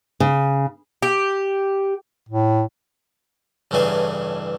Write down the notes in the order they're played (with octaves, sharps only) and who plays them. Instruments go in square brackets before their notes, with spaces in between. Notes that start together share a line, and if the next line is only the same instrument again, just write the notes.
[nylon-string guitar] C#3
[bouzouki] G4
[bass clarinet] A2
[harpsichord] A1 G2 C#3 E3 A3 G#4